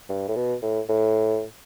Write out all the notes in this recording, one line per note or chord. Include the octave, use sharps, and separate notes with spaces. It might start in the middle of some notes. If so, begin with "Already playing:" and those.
G2
A2
B2
A2
A2